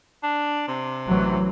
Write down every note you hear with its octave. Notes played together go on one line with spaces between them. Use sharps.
D4
C3
A1 E3 F#3